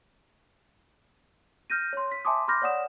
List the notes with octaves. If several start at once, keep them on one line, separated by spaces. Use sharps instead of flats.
F6 G6 A#6 D#7
C#5 C6
B6
E5 G#5 A5 C6 D6 D#6
B5 C6 D6 F6 G6 A#6
C#5 D5 F#5 D#6 E7